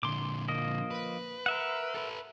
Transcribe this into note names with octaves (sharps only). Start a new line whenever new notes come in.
A#2 D3 C6 D6
F3 A#3 D#5
B4
A#4 E5 F#5
A4 B4